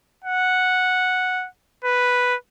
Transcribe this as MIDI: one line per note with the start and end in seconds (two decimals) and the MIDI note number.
0.24 1.47 78
1.85 2.35 71